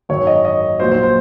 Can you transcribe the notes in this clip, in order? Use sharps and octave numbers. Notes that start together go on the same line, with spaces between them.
G#1 F#2 D#3 F#3 C#5
D#5
D#5
A#1 A#2 F#3 C5
C5
C5